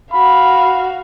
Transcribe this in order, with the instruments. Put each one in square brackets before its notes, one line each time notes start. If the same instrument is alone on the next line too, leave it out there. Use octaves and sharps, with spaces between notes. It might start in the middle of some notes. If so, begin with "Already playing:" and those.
[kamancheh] F#4 F5 [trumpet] B5